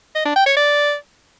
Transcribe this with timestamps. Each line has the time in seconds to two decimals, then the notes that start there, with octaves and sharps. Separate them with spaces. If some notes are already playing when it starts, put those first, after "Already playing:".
0.15 D#5
0.26 D4
0.36 G5
0.46 C#5
0.57 D5